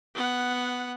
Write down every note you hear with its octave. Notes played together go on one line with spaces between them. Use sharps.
B3 F#5